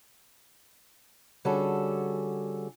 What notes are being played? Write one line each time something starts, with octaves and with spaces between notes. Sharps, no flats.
D3 G3 C#4 F#4 G#4 A4